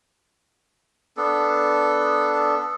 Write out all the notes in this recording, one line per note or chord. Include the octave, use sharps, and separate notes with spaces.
B3 D4 A4